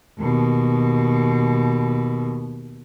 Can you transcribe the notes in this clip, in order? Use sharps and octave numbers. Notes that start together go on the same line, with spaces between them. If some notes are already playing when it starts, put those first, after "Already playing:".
D#2 B2